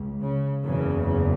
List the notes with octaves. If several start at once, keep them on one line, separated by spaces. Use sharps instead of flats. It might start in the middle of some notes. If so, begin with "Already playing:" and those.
Already playing: C#2
C#3
F#1 E2 C#3
C#3